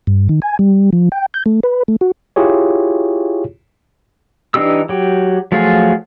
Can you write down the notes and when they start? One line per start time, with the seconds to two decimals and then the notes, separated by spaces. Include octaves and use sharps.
0.07 G2
0.29 D#3
0.42 G#5
0.59 G3
0.93 F3
1.12 G5
1.34 G6
1.46 A3
1.63 B4
1.88 A3
2.01 F#4
2.36 E4 F4 G4 G#4 C#5
4.54 E3 D4 D#4 G4 E6
4.89 F#3 G4
5.52 F3 F#3 A3 F4 G#4